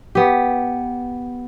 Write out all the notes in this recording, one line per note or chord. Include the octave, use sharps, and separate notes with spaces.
B3 G4